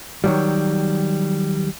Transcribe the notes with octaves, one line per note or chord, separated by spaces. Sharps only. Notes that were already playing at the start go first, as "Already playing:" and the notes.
D#3 F#3 G3